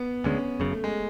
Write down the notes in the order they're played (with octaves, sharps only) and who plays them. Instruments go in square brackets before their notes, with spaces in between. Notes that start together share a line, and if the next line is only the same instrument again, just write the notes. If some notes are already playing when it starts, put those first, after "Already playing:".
Already playing: [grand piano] B3
[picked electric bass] D2 D3 G#3 [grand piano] C#4
[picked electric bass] F#1 F#2 C#3
[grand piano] A3
G#3